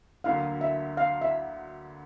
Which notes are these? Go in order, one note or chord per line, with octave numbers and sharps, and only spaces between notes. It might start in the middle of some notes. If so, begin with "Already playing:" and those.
D2 D3 F#3 A#3 F5
E5
F5
E5